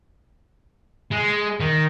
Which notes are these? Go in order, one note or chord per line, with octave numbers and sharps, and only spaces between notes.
G#3
D#3